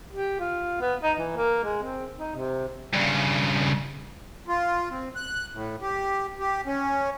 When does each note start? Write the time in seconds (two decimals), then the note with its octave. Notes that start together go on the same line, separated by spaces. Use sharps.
0.13 G4
0.40 F4
0.81 B3
1.03 D#4
1.18 E3
1.37 A#3
1.64 G#3
1.83 C4
2.18 D#4
2.35 C3
2.94 G2 C#3
4.48 F4
4.91 C4
5.16 F#6
5.54 A2
5.82 G4
6.40 G4
6.66 C#4